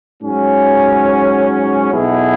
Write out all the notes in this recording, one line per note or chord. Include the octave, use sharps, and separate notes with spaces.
G#2 F#3 C#4
B1 B2 B3 E4 G#4